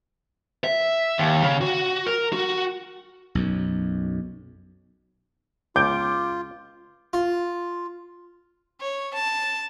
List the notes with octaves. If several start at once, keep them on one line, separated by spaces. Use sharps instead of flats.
E5
D#2
C#3
F#4
A#4
F#4
B1 F#2
C#2 F4 D6 G6 D7
F4
C#5
A5